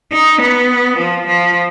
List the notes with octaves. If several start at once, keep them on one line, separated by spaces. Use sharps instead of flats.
D#4
B3
F3
F3